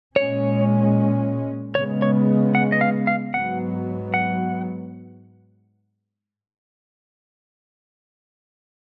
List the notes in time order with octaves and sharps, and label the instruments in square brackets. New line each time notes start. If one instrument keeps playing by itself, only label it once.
[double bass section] A#2 G#3 C#4 [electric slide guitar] C#5
[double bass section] C#3 G#3 B3 [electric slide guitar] C#5
[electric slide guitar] C#5
F#5
D#5
F5
F5
[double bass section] G#2 F#3 B3 [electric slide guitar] F#5
[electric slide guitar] F#5